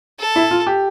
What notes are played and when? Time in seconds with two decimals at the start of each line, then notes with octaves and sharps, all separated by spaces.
0.19 A4
0.36 E4
0.51 F4
0.67 G4